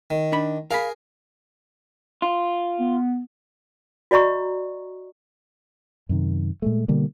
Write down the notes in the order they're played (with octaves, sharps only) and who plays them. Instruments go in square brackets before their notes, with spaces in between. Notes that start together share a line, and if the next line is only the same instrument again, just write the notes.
[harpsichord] D#3
[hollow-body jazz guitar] D4 B5
[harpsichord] G#4 A#4 [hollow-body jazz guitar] F5 B5
[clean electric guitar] F4
[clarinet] B3
[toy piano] F#4 D5 D#5 A#5 C#6
[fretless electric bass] F#2 C3 D#3
A#2 G#3 A3
B2 D3 G3 A#3